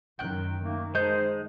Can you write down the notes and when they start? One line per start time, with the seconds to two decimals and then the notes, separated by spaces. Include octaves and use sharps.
0.19 F#2 D#3 G5 F#6
0.63 D#3 A3 A#3
0.95 G#3 D#4 C5 A5 G6